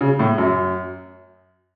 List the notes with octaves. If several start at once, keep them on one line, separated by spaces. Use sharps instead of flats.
C#3
A2
F#2